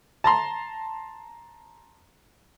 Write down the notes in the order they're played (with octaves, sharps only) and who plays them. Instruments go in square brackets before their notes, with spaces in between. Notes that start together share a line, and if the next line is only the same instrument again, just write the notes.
[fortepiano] A5 A#5 C6